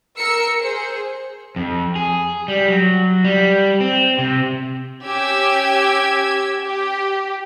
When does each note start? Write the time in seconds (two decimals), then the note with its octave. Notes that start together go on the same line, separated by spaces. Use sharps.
0.18 A#4 E6 C#7
0.62 G#4 C5
1.56 F2
1.96 G#4
2.48 G3
2.68 F#3
3.24 G3
3.80 C4
4.19 C3
5.03 C#4 G4 E6 G#6
6.62 G4